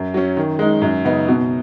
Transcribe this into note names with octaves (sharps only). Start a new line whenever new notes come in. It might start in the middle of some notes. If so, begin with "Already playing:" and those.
Already playing: F#2
F#3 C#4
D#3
G#3 D#4
F#2
C#3 B3 D#4
B2